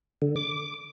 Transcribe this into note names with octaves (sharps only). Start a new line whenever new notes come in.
D3
D6